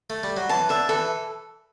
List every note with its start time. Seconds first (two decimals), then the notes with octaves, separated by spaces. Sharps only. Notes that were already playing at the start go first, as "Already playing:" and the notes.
0.10 A3
0.23 G3
0.37 F#3
0.49 E3 A5
0.69 D3 E5
0.89 E3 A4